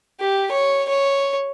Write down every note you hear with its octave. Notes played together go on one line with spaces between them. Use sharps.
G4
C#5
C#5